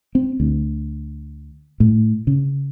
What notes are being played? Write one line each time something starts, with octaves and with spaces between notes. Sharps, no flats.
C4
D2
A2
C#3